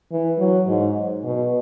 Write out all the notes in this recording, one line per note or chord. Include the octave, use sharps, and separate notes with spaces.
E3
F#3
G#2
B2